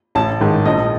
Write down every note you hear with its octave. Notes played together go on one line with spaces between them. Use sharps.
A1 A5
G#2 D#3
A#1 D#5